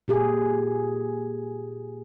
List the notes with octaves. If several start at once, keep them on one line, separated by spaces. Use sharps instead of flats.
A#2 G4 G#4